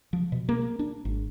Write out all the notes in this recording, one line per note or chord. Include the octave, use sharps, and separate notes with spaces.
F3
B2
A#3
D4
G#1